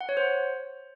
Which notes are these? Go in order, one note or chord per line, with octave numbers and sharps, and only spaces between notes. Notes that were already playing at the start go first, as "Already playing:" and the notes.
F#5
C#5
C5